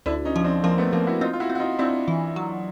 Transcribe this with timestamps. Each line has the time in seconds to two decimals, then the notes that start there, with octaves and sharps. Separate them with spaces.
0.06 D2 D4 E4
0.25 C#4 D#4
0.36 F3 C#4
0.44 C4 D4
0.63 F3 A#3 C4
0.78 A3 B3
0.92 F3 A#3 C4
1.07 E4 F#4
1.21 C4 D#4 F4
1.33 F4
1.40 E4 F#4
1.50 C4
1.55 F#4
1.59 D#4 F4
1.79 C4 D4 E4
2.08 E3
2.36 F#3